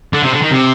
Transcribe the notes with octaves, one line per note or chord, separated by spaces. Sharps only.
D3
C3
D3
D#3
C3